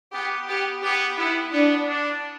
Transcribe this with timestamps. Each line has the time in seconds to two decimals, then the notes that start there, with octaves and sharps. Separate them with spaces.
0.13 B3 G4
0.48 B3 G4
0.82 B3 G4
1.17 B3 E4
1.52 B3 D4
1.87 D4